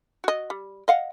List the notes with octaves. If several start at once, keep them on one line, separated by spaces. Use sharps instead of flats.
F#4 D#5
G3
D#5 F5 F#5